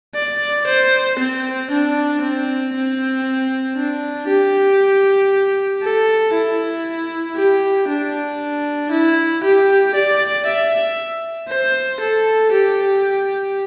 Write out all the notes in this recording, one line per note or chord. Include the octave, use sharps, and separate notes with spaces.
D5
C5
C4
D4
C4
C4
D4
G4
A4
E4
G4
D4
E4
G4
D5
E5
C5
A4
G4